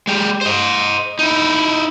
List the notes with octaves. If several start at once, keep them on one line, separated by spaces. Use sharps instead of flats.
G#3 G4
C5 D#5
D#4 E4